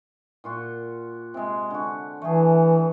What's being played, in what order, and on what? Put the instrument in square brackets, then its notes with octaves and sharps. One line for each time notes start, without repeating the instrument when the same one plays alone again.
[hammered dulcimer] A#2 F4 F#4
C3 G#3
D3 F#4
[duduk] E3 [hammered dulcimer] A3 G#4